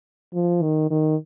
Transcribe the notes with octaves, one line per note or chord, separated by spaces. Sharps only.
F3
D#3
D#3